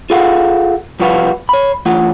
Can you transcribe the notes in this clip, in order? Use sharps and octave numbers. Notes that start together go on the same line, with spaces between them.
F4 G#4 A4 F5 F#5
C2 F3 G3 F#4 B4 F5
C#5 B5
E3 A3 F4 F#5